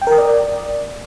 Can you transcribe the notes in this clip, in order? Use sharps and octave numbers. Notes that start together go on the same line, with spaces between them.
G5
A#4
D#6
D5